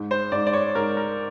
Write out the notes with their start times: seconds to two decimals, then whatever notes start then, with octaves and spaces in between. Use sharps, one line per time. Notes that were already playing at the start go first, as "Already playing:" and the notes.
Already playing: G#2
0.11 C5
0.32 G#2 D5
0.47 D5
0.53 C#5
0.75 G#2 A#4
0.97 A#4